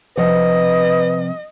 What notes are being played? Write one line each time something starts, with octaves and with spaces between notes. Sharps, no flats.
C3 F3 B4 D#5 F#5